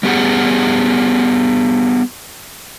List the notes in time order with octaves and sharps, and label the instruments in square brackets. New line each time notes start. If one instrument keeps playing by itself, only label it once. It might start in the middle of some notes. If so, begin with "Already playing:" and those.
[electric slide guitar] G3 B3 G4 G#4 F#5